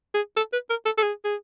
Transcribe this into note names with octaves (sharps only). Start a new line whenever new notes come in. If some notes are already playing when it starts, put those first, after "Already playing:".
G#4
A4
B4
A#4
A4
A4
G#4
G#4